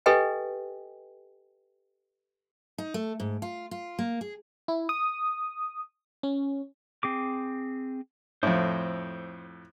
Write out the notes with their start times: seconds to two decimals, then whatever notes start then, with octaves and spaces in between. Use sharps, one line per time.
0.06 G4 A4 B4 D#5 G5 G#5
2.78 D#4
2.94 A3
3.20 G#2
3.42 F4
3.71 F4
3.99 A#3
4.21 G#4
4.68 E4
4.89 D#6
6.23 C#4
7.03 C4 G#4 D6
8.43 F2 A2 C5